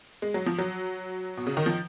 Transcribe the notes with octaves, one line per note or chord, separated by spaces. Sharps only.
G#3
F#3
F3
F#3
B2
C#3
D#3
F3